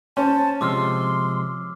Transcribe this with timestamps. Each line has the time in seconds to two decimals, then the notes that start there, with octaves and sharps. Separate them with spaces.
0.17 C#4 C5 A5
0.61 C3 F3 G#3 C6 D6 E6 F6